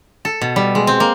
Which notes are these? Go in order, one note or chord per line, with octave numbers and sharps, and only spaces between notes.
A4
B2
G3
G#3
C4
A#3